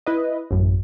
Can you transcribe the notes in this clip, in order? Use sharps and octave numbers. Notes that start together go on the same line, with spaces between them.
E4 B4 D#5
A1 F#2